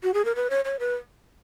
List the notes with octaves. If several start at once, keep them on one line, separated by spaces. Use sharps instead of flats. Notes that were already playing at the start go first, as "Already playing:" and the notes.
F#4
G#4
A#4
B4
C#5
C#5
B4